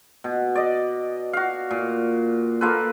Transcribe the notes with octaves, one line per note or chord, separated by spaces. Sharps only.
B2
D5 D#5
F#4 F5
A#2
A#3 F4 A4 B4